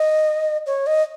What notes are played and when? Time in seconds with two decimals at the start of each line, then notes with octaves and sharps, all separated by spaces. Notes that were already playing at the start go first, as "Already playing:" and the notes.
Already playing: D#5
0.66 C#5
0.87 D#5